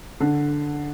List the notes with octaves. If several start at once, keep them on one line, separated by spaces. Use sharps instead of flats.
D3